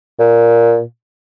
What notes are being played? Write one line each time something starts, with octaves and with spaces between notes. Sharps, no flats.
A#2